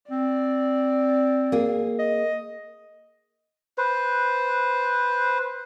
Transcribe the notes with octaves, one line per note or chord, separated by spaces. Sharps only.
C4 D5
A#3 G#4
D#5
B4 C5